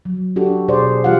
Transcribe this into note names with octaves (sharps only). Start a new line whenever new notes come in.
F#3
D4 F#4 G4 A4
B2 G#4 C5 D5
E3 G3 F4 G4 F5 F#5